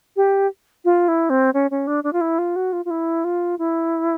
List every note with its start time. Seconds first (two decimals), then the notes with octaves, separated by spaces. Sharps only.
0.16 G4
0.85 F4
1.08 E4
1.30 C4
1.54 C#4
1.71 C#4
1.87 D4
2.04 D4
2.13 F4
2.21 E4
2.38 F4
2.56 F#4
2.73 F4
2.85 F4
2.90 E4
3.24 F4
3.59 E4